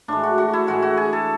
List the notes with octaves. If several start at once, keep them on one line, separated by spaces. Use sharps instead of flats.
A2 E3 G#3 D4
F#4
F#4
E4
A2 E3 G#3 F#4
F#4
G#4
A4